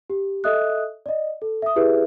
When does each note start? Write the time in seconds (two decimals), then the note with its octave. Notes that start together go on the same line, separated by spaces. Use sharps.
0.10 G4
0.44 A4 D#5 E5 D#6 F#6
1.06 D5 D#5
1.42 A4
1.62 E5 D#6
1.76 E4 G4 G#4 B4 E5